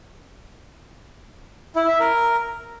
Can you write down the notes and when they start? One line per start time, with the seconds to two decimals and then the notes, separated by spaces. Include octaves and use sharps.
1.76 E4
1.88 E5
2.00 A#4